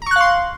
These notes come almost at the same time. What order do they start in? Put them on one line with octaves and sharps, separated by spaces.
A#5 C#6 F#6 F5 C6